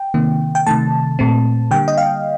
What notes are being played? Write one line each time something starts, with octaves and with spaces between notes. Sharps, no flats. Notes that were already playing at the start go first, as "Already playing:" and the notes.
Already playing: G5
C3 D#3 A#3
G5
C3 D#3 A3 A5
A#2 A3 C4
D3 G3 A#3 G5
D#5
F5